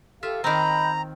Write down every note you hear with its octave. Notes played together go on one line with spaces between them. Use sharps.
F4 G4 A4 E5 F5
D#3 C4 D#5 A#5 B5 G6